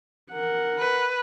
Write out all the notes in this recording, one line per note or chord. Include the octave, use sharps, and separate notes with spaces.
A#4 F#5
B4